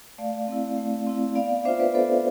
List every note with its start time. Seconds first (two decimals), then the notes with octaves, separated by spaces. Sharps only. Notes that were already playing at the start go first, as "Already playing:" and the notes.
0.18 A3 D5 F5
0.48 C4 E4
0.77 A3
1.07 C4 E4
1.35 B3 D5 F5
1.65 D4 F4 C5 E5
1.79 B4 D5
1.94 B3 A4 C5